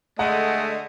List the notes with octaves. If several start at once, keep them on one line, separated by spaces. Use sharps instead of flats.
D3 G#3 A3 D#5 F#5